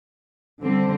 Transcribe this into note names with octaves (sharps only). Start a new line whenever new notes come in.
D3 G3 C4